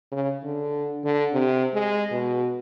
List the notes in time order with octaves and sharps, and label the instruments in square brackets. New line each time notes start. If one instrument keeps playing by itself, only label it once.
[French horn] C#3
D3
D3
C3
G#3
B2